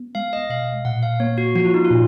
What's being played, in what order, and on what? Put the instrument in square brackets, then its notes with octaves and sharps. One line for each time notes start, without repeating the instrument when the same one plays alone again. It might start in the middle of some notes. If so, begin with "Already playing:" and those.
Already playing: [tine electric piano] B3
[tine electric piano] G#3 [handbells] F5
[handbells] D#5
[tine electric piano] B2 [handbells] F5
[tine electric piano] A#2 [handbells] F#5
[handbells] F5
[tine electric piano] A#3 [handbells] C#5
[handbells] F#4
[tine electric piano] F3 [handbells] F#4
[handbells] F4
D#4
F4
[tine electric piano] A#2